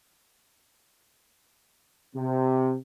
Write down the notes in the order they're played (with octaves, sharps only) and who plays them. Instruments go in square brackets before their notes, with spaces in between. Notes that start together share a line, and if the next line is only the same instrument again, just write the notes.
[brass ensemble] C3